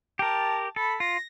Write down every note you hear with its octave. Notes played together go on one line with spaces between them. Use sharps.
G4 A#4 A5
A4 B5
F4 A#6